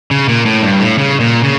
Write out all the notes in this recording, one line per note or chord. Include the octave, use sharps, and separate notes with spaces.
C#3
A#2
A2
G2
A2
C#3
A#2
C#3